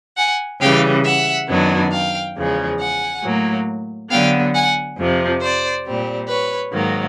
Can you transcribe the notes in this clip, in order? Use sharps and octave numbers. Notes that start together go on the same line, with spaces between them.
F#5 G#5
C#3 E3 G3 F5 G5
E5 F#5
F#2 D#3 F#3 B3 D4
F5 G5
E2 C#3 F3 G#3
F#5 G#5
A2 F#3 A#3
D3 F#3 B3 F5 G5
F#5 G#5
F2 C3 F3
C5 D5
A#2 G3 C4
B4 C#5
G#2 D#3 F#3 A#3